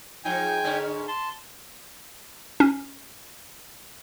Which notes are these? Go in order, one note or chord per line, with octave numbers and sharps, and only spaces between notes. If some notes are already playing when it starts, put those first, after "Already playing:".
G#2 F3 D#4 G5 G#5
G#2 D3 C#4
A5 C6
C#4